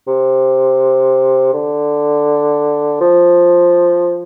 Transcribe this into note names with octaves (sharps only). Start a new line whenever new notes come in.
C3
D3
F3